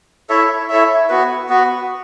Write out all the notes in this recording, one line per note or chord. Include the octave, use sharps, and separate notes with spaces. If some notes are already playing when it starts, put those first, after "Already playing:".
E4 A4 C#5 E5
E4 A4 C#5 E5
B3 F#4 B4
B3 F#4 B4